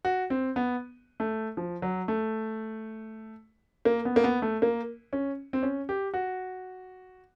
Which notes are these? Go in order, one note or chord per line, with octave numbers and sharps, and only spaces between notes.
F#4
C4
B3
A3
F3
F#3
A3
A#3
B3
A#3
B3
A3
A#3
C#4
C4
C#4
G4
F#4